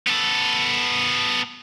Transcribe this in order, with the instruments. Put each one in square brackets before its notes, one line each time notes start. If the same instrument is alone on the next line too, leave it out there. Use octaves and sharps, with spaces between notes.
[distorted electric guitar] B3 A4